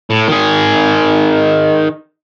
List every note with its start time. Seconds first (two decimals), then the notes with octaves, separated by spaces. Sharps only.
0.10 A2
0.28 D#3 G#4